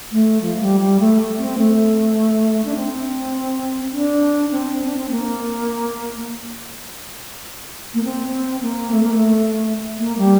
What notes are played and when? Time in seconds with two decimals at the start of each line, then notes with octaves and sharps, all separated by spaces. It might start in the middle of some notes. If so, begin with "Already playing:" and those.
0.12 A3
0.42 F3
0.56 A3
0.61 G3
0.80 G3
1.00 A3
1.39 C4
1.58 A3
2.65 D4
2.75 C4
3.93 D4
4.51 C4
4.84 D4
4.97 C4
5.10 A#3
7.94 A#3
8.04 C4
8.62 A#3
8.92 A3
9.03 A#3
9.14 A3
9.98 A#3
10.18 G3